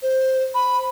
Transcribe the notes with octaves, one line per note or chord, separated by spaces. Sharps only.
C5
B5